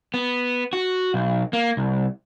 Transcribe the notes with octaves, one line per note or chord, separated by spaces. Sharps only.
B3
F#4
B1
A#3
C2